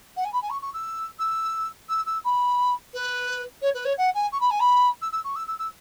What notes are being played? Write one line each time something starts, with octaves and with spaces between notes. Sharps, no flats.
F#5
G#5
B5
G#5
C#6
C#6
E6
E6
E6
E6
B5
B4
C#5
B4
C#5
F#5
G#5
C#6
B5
G#5
B5
E6
E6
C#6
E6
E6
E6